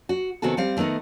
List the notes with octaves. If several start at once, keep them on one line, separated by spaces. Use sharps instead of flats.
F#4
C3 D#3 B3 F#4 G#4 A4
G3 C4 F5
D#3 A3 B3 D#4 A#4